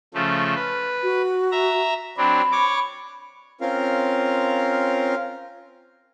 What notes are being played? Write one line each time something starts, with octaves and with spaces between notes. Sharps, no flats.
C#3 F3 A3
B4
F#4
E5 A#5
F#3 C4 D4 B5
C#5 D6
C4 C#4 F4 A#4 F5